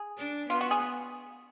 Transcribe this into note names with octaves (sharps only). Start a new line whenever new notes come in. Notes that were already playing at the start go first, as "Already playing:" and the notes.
Already playing: G#4
D4
B3 F4
F#4
G#4